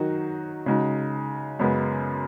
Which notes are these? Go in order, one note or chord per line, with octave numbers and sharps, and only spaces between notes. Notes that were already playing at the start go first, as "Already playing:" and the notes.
Already playing: D#3 F#3 D#4 F#4
C#3 G#3 D#4 F#4
F#2 C#3 G#3 B3